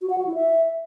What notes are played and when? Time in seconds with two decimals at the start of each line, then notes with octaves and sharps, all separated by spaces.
0.02 F#4
0.10 F#5
0.18 F#4
0.26 E4
0.35 E5